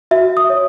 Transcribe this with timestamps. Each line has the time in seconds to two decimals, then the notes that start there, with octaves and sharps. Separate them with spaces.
0.11 F#4 E5
0.37 D#6
0.50 C#5